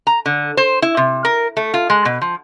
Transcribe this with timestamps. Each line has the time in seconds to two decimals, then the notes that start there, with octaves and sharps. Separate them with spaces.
0.07 A#5
0.26 D3
0.57 C5
0.82 E4
0.97 C3
1.25 A#4
1.57 A3
1.74 F4
1.90 G#3
2.05 B2
2.21 F3